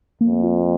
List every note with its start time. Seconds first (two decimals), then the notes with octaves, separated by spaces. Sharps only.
0.21 F2 A#3
0.44 F4